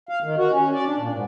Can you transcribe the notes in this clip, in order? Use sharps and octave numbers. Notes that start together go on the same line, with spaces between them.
F5
D#3
F#4
C#4
D5
D4
A#2
G#2